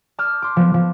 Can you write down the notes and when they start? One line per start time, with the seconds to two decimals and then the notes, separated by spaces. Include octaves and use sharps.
0.19 A5 D6 D#6 F6 G6
0.42 C6 D6
0.56 F3 B3
0.74 F3